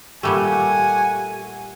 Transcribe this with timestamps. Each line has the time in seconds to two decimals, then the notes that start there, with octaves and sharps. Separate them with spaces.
0.23 A#2 G3 A3 G4 A4 F#5 G#5 C#6